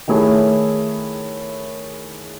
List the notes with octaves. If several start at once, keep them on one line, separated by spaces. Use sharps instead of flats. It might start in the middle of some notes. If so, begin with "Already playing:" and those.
D#3 A3 E4 G#4 C#5